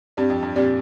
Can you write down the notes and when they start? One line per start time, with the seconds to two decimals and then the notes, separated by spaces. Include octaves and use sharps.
0.17 G2 C4 G4 D5
0.30 F2
0.42 G2
0.56 A#2 C4 G4 D5